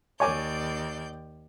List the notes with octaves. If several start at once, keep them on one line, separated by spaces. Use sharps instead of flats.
D#2 C#5 D5 G#5 D6 G6